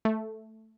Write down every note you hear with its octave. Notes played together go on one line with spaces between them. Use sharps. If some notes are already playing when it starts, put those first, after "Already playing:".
A3